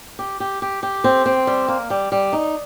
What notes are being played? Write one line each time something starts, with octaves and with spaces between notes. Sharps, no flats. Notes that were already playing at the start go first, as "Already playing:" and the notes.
G4
G4
G4
G4
C4
C4
G3
A#3
G3
G3
D#4